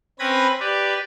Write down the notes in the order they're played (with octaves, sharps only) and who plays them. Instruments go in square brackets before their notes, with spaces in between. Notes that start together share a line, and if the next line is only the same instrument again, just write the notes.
[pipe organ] C4 C#4 B4 B5 G#6 A#6
G4 B4 D5